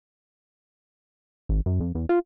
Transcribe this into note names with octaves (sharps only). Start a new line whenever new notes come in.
G#1
F#2
F2
E2
F4